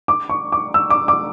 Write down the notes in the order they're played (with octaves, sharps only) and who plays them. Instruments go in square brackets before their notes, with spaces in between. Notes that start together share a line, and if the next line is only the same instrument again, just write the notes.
[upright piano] D6
C#6
D6
E6
D6
D6